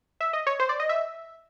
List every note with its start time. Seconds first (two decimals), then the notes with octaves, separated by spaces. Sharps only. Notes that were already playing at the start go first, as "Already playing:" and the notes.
0.21 E5
0.33 D#5
0.47 C#5
0.60 C5
0.69 D5
0.80 D#5
0.89 E5